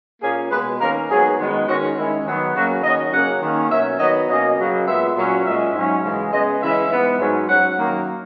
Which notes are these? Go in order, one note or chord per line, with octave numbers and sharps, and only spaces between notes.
A#2 A#3 C#4 G#4
B2 G#3 B3 B4
D#3 A#3 C#4 A#4
G#2 F#3 B3 G#4
F#2 D#3 G#3 B3
D#3 G#3 C#4 F#4
D#3 G#3 C#4 E4
D#3 F#3 B3
F#2 C#3 F#3 A#3 C#4 F#4
D#3 F#3 C#4 D#5
C#3 F#3 A#3 C#4 F#5
D#3 A#3 C#4
B2 F#3 C#4 E5
D#3 F#3 B3 D#5
B2 F#3 A#3 C#4 D#5
C#3 F#3 A#3
A#2 G#3 B3 E5
A#2 F#3 C#4
A#2 G#3 C#4 E5
G#2 F#3 C#4
F#2 C#3 E3 G#3
C#3 G#3 B3 D#5
C#3 E3 G#3 C#4 E5
G#2 E3 G#3 B3
G#2 F#3 C#4
G#2 F#3 C#4 F#5
F#2 D#3 F#3 A#3